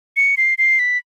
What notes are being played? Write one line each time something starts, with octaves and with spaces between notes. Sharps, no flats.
C#7
C7
C7
B6